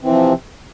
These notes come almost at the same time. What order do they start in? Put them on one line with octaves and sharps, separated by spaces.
E3 C4 C3 F3